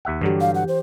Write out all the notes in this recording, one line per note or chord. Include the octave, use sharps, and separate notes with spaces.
D#2 E5 F#5
G2 D3 E3 F#3 G4
F5
F#5
C5